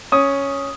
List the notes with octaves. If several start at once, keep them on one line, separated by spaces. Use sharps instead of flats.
C#4 D#6